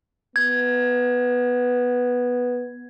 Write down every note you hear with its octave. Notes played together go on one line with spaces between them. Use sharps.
B3 G#6